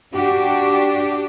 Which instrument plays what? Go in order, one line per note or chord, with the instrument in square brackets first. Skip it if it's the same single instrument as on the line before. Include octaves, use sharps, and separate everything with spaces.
[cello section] D4 F#4 G4